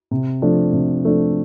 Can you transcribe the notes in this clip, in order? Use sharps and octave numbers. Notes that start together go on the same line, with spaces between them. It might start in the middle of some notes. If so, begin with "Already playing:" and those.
C3
F3 A3 D4
C3
F3 A3 D4